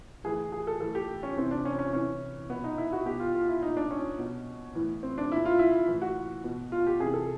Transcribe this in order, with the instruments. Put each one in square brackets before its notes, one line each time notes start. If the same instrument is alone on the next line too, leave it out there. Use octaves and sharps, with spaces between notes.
[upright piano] A2 E3 G#4
G#4
A4
A2 E3 A4
G4
C#4
C3 E3 C4
D4
C#4
C#4
C3 E3 C#4
B2 B3
D#4
E4
F#4
B2 G4
F4
F4
E4
A#2 D#4
D4
C#4
B2
A2 E3
C4
D4
A#2 E4
F4
E4
A2 E3
F#4
B2
F4
G4
C3 E3 G#4
A4